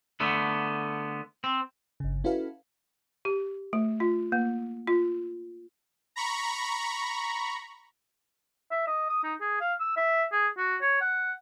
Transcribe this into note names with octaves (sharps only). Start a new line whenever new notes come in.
D3 A3 B3
C4
G1 C#3
C#4 E4 F#4 A4 B4 F5
G4
A3
F4
A#3
F4
A#5 B5 C#6
E5
D#5
D#6
D#4
G#4
F5
E6
E5
G#4
F#4
C#5
F#5